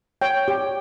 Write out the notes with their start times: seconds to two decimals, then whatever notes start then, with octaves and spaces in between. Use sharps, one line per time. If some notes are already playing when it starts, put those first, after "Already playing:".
0.22 C#5 G5
0.48 G4